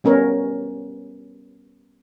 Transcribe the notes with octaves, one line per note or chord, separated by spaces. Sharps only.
G3 B3 C#4 A#4 C#5